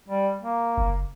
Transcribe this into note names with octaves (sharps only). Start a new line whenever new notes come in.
G3
A#3
F#1